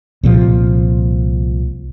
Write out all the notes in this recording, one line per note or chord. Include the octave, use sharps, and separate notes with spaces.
C2 A#2 F3